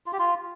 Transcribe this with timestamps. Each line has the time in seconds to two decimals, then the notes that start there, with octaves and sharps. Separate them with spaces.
0.06 F4
0.13 G4
0.19 F4